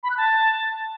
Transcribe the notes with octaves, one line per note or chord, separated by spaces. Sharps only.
B5
F#6
A5